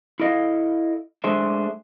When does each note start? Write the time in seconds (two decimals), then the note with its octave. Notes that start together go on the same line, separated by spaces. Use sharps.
0.20 E4 A4 D#5 F5
1.24 G#3 A3 D4 G#4 C5 E5